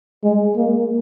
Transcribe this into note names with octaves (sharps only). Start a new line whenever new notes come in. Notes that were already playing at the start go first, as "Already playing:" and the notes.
G#3
A#3